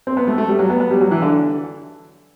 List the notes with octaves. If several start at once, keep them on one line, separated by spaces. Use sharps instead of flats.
C4
B3
A3
A3
G3
F#3
B3
B3
G3
F#3
E3
D3